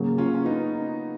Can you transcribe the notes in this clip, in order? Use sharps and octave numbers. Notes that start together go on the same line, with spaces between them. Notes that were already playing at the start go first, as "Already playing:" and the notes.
Already playing: C#3 F#3 A#3
C#4 F4
C#4
B3 D#4